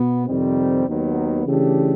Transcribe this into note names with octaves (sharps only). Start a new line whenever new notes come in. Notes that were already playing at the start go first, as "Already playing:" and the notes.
Already playing: B2 B3
F2 C3 D#3 G3 C4
D#2 D#3 F#3 B3
C#3 E3 A3 D4 G4